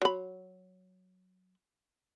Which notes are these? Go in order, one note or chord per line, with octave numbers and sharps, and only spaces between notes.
F#3 B5